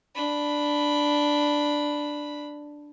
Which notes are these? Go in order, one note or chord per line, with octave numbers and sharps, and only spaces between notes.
D4 B5